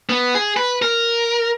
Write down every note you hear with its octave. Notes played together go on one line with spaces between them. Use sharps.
B3
G#4
B4
A#4